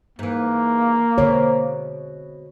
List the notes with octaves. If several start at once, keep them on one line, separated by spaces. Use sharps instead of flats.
G#2 E3 A#3
B2 D3 G#3 C4 C#5